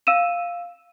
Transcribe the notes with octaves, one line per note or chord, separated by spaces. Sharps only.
F5 E6 D#7 E7